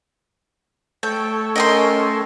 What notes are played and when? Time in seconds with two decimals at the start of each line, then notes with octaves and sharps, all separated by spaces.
1.03 A3 A4 C#5 G5
1.56 C#4 A#4 D#5 G5 C6